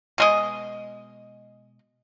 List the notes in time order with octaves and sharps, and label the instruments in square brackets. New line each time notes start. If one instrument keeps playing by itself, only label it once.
[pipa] B2 G#3 D#5